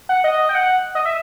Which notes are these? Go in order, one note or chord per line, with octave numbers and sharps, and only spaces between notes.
F#5
D#5
G5
F#5
D#5
E5